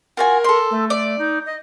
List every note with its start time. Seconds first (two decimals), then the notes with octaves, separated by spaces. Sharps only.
0.17 F4 F#4 A#4 G#5
0.44 A4 C6
0.70 A3
0.90 D5
1.18 D#4
1.45 D#5